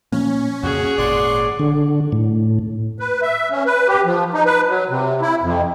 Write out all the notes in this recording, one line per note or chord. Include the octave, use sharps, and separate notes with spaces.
A#2 F3 A#3 C#4
F2 A#2 C#3 F#4 G#4 C#5
G#1 A#2 D5 F#5 C6 F#6
D3
A2
B4
E5
C#4
B4
G4
F3
D#4
B4
F#3
C3
E4
F2